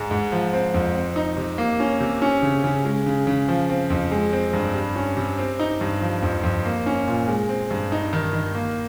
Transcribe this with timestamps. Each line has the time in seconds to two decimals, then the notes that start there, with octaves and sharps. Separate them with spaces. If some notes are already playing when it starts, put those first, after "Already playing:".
Already playing: G#2 G#3
0.11 G#2
0.32 F3
0.53 C4
0.74 F2
0.95 C4
1.16 D#4
1.37 C3
1.58 A#3
1.80 C#4
2.00 C3
2.22 C#4
2.42 C#3
2.64 C#3
2.85 G#3
3.06 C#3
3.27 C#3
3.48 F3
3.70 C4
3.90 F2
4.12 G#3
4.33 C4
4.53 G2
4.74 G3
4.96 C#4
5.17 C3
5.38 C4
5.60 D#4
5.81 G2
6.01 F3
6.22 F2
6.43 F2
6.65 A#3
6.86 C#4
7.07 A#2
7.28 G#3
7.49 C4
7.70 G2
7.92 D#4
8.13 D#3
8.33 D#3
8.55 A#3